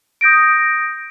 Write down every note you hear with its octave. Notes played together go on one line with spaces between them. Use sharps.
D#6 G6 A#6 D7